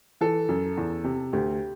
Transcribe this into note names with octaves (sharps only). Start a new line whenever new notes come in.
E3 A4
F#2
E2
C3
D2 G4